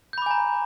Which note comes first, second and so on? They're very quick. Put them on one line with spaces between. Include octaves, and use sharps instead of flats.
G6 B5 D6 G#5 A#5